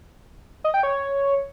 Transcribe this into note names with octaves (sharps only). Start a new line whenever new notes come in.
D#5
G5
C#5